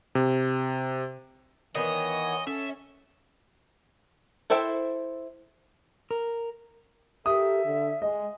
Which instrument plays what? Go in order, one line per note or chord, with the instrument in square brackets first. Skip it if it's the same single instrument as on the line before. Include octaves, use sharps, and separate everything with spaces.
[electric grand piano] C3
[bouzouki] D#3 B3 [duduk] E3 [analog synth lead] C#5 [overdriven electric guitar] D#5
[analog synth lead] C#4 [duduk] A4 [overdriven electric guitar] E5
[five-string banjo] E4 A4 C5 E5 G5
[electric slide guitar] A#4
[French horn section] G4 A4 A#4 [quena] E5 [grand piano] D#6
[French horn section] D3
[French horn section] G#3 [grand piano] D#5